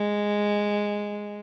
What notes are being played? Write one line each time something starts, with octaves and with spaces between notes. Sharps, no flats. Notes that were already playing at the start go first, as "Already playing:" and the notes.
Already playing: G#3